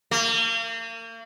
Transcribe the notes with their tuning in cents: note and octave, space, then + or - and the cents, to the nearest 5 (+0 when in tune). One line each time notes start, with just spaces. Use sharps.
A#3 -40